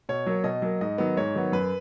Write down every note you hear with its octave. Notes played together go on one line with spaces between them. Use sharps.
B2 C#5
F#3 A#3
B2 D#5
F#3 A#3
G#2 D#5
D#3 F#3 B3
G#2 C#5
D#3 F#3 B3
F#2 B4